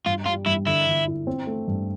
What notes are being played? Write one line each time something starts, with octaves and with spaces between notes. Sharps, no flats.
G2 F4
G3 F4
G2 E4
D3 E4
D3
E4
C4
A3
G2